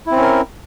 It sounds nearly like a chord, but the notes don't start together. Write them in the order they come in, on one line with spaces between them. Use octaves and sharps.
E4 C4 C#4 A#4